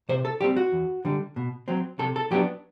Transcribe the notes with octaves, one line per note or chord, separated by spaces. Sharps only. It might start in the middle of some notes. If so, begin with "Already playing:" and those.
C3 C5
A4
G3 C4 G4
F#4
E2
D3 G3
B2
F#3 C4
C3 A4
A4
F#3 B3 D4 G4